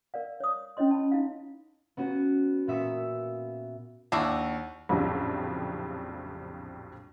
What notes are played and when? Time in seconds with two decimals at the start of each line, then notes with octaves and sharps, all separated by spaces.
0.14 A#4 D5 F5
0.40 C#5 D#6
0.77 C#4 E4 C#5 D#5 C6
0.91 A5 B5
1.12 D#4 E4 F5
1.97 B3 C#4 F#4
2.67 A#2 B3 E5 C#6 D#6 B6
4.12 D#2 D4 E4 F#4
4.89 A#1 F2 A2 C#3 F#3 G3